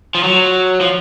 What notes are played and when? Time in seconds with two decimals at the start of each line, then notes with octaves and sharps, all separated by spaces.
0.15 F3
0.23 F#3
0.81 F3